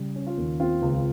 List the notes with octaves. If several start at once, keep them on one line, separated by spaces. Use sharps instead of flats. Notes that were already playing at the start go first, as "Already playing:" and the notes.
Already playing: C#3 G3
C#4
F4
D#2
C4 F4
C#2